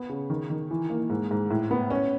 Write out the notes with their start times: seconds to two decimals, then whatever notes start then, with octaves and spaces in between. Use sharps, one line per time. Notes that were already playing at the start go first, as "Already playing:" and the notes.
Already playing: B3
0.09 C#3
0.30 D#3
0.50 D#3
0.71 E3
0.90 A#3
1.10 G#2
1.31 G#2
1.51 A2
1.71 B3
1.90 C#4